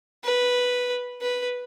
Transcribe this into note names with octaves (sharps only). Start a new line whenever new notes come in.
B4
B4